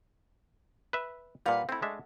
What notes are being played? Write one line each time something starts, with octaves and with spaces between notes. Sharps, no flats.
B4 E5
A#2 G3 B4 F5 F#5
A3 C4 E4
G#3 D4 E5